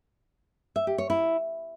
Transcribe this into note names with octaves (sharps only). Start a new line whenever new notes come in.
E5
G4
C#5
E4